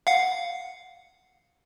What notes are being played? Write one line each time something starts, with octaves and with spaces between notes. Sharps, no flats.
F5 F#5